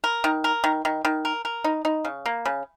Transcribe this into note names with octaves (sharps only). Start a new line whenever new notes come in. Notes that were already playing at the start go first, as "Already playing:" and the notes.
A#4
D#3
A#4
D#3
D#3
D#3
A#4
A#4
D#4
D#4
C#3
A#3
C#3